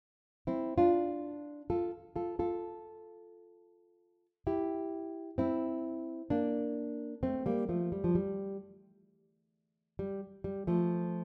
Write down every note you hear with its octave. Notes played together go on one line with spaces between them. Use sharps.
C4 E4
D4 F4
F4 A4
F4 A4
F4 A4
E4 G4
C4 E4
A#3 D4
A3 C4
G3 A#3
F3 A3
G3
F3
G3
G3
G3
F3 A3